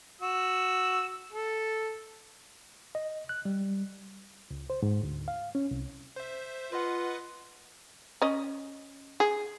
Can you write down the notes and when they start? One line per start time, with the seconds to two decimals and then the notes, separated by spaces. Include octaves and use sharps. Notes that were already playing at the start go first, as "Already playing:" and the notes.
0.22 F#4 E6
1.32 A4
2.95 D#5
3.29 F#6
3.45 G3
4.51 C#2
4.70 C5
4.82 G#2
5.03 D2
5.28 F5
5.55 C#4
5.71 C2
6.16 C5 E5
6.72 F4 B4 D#5 F#5
8.22 C#4 D#5
9.20 G#4